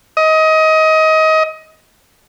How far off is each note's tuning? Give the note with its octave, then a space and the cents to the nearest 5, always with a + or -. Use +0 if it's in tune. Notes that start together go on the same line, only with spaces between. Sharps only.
D#5 +25